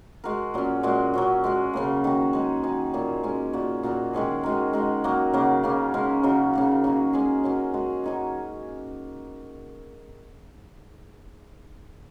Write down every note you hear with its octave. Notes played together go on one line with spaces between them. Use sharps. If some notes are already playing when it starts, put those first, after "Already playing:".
G#3 F#4 A#4
A#2 F#3 C#4
A#2 G#3 F#4
F#3 C#4 F#4
G#3 C#4 F#4
C#3 F#3 A#3
D#3 A#3 F#4
G#3 D#4 G#4
F#3 D#4 G#4
A#2 A#3 C#4 A#4
G#3 C#4 A#4
A#2 A#3 F#4 A#4
A#2 A#3 F#4 A#4
D#3 G#3 C#4 G#4
D#3 G#3 F#4 A#4
G#3 F#4 A#4
F#3 A#3 F#4 A#4
C#3 F#3 A#3
C#3 A#3 C#4
G#3 C#4 A#4
C#3 F#3 D#4 F#4
C#3 A#3 F#4
F#3 A#3 D#4 F#4
G#3 C#4 G#4
F#3 C#4 A#4
G#3 F#4 A#4
F#3 D#4 G#4